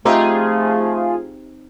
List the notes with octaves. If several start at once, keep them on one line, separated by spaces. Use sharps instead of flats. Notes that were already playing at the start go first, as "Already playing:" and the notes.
F3 A3 C4 D#4 F4 G4 G#4